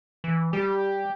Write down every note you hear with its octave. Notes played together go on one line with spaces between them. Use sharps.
E3
G3 G4